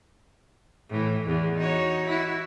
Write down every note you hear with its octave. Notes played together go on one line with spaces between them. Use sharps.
A2 E3
E2
D#4 F#4 C#5
E4 F#4